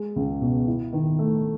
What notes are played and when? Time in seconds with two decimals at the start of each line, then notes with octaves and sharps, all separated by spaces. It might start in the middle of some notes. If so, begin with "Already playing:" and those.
Already playing: G#3
0.16 C#2
0.41 B2
0.67 E4
0.93 D#3
1.19 A3